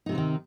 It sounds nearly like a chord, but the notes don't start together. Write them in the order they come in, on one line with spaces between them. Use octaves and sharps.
D#4 C3 C4 F#3 D#3